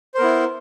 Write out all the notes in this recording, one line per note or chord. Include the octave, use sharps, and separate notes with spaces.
B3 E4 A#4 C5